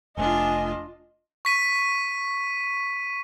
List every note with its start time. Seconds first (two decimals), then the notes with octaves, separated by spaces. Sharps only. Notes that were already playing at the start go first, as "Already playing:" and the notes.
0.17 F1 A3 D4 F4 D#5 G#5
1.45 C#6 B6 D#7